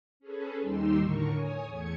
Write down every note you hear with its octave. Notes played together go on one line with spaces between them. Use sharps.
C#4 G#4 A4 B4
D#2 G3 D#4 G4 C6 E6
A2 D3 A#4 C#6
C#5 G#5 D#6
E2 A3 G#6 C#7